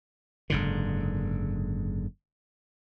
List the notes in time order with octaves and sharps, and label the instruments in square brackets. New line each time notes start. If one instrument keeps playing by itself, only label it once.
[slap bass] F#1 G#2 D3